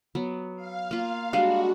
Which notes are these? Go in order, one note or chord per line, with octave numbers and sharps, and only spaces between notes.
F#3 B3
F5
A#3 F4
G3 G#3 D4 F#4 F5